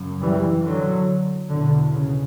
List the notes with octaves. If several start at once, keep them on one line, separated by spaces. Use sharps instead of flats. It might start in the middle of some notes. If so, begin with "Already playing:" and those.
Already playing: F#2 C#3
E3 G3
D3 F#3
E2 B2 D3
C#3